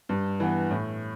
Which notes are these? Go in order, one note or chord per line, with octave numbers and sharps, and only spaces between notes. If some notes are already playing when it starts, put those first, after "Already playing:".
G2
E3 B3
A2